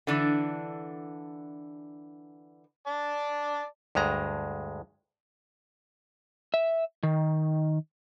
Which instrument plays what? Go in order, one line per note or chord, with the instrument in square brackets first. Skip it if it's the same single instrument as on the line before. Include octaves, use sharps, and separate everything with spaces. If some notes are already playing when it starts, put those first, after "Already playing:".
[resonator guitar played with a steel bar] D3 E3 D4
[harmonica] D5 A5
[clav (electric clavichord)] D2 G2 G#3 A#5
[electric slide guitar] E5
D#3